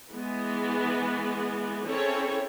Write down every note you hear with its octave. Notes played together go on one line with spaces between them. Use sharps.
E3 G#3 B3
C4 C#4 E4 G#4 A4 C#5